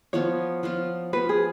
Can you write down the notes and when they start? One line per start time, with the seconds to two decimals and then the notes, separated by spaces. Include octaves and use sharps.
0.13 F3 B3 F4 C#5
0.63 F3 B3 F4
1.13 F3 B3 F4 B4
1.29 G#4